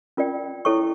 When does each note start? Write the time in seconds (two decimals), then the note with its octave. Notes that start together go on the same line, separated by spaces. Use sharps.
0.17 C#4 F4 A#4 D5 G5
0.65 E4 A4 C#5 G5 C#6